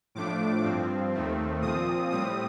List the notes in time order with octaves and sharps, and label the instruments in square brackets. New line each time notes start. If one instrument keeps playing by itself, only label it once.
[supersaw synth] A2 F3 A3 D4 D6
G2 F3 C4
D#2 D#3 A3 C4
A#2 F3 C4 D#6
A2 G3 C4 D#6